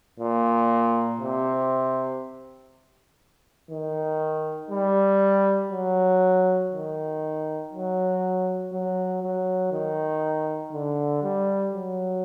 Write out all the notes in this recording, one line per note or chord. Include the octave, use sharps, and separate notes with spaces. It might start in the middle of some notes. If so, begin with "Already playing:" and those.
A#2
C3
D#3
G3
F#3
D#3
F#3
F#3
F#3
D#3
D3
G3
F#3